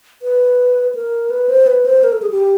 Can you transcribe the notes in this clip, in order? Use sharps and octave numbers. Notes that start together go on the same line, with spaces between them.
B4
A#4
B4
C5
B4
C5
A#4
A4
G#4
G4